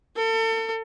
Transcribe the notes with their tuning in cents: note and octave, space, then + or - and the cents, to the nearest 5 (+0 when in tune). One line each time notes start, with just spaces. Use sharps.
A4 +35